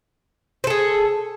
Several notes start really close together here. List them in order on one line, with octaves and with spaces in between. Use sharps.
C5 A4 G#4